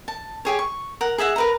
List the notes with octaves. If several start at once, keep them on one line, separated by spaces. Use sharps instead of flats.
A5
G4 G#4 C#5
C#6
A#4 F#5
G#4 D#5 E5 F#5
A#4 B4 A#5